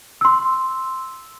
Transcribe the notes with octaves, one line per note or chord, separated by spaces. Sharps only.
C6 E6